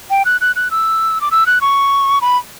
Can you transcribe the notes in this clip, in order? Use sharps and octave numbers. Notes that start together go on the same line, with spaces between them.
G5
F#6
F#6
F#6
E6
D6
E6
F#6
C#6
B5